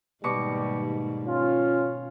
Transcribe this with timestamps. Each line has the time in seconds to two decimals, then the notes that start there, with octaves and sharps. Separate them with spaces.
0.24 G#2 B2 D#3 G3 A#3 C#6 D6
1.27 C#4 F4